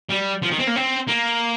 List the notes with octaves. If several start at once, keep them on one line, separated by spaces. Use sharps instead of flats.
G3
F3
D#3
C4
A#3
C4
A#3